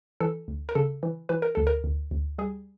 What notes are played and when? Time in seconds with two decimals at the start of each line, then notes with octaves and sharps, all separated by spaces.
0.20 E3 A4
0.48 D2
0.69 A#4
0.75 C#3 A4
1.03 E3
1.29 E3 B4
1.42 A#4
1.55 D2 A4
1.67 A#4
1.84 D2
2.11 D2
2.38 G3 G#4